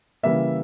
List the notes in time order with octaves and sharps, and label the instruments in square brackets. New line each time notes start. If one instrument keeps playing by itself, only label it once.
[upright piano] C#3 E3 G3 A#3 E5